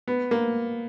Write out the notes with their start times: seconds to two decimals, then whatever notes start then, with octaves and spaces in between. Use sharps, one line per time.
0.08 B3
0.31 A#3